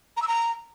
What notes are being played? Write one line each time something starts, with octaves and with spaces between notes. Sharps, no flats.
A#5
E6
A#5